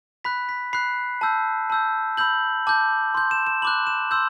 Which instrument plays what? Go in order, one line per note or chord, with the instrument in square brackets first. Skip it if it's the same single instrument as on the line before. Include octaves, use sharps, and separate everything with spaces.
[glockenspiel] B5 F#6 B6
B6
B5 F#6 C7
A5 E6 G6
A5 E6 G6
B5 E6 G6 F#7
A5 D6 G6
C6 G6
E7
E7
B5 D6 F#6 F#7
E7
C6 E6 G6